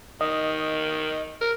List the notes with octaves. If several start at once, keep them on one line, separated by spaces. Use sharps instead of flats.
D#3 D#5
A#4